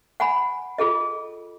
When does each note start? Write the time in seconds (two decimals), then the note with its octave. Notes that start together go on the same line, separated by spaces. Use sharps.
0.20 F#5 G#5 B5
0.78 F4 G#4 A4 D#5